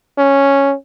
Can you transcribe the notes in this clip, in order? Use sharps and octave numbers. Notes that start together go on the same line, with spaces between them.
C#4